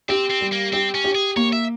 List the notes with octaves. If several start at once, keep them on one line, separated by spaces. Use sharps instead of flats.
C4 G4
C4
G3
A#3
C4 G4
C#4
G4
G#4
A#3 C#5
E5